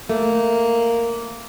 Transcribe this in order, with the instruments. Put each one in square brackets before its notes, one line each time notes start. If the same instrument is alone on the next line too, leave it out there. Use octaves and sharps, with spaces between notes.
[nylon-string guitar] A3 [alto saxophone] A#3